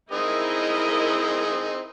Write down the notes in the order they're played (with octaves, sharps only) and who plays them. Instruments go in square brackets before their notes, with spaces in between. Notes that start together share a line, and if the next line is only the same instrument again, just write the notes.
[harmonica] C4 D#4 G#4 [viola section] E4 A#4 D#5